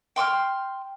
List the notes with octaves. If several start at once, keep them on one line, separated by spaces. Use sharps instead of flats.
G5 C6 D6 F6